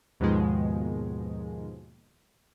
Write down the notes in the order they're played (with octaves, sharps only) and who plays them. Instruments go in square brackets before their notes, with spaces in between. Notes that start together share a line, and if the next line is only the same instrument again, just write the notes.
[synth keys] D#2 G#2 B2 D#3 F3 G#3